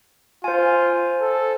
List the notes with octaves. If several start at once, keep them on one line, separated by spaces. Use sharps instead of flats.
F4 C5 G#5
A4